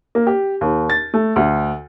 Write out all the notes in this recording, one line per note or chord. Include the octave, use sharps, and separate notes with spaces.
A#3
G4
D#2
A6
A3
D2